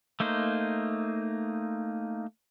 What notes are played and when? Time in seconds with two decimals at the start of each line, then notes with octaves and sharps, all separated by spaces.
0.20 A3 A#3 D#4 C5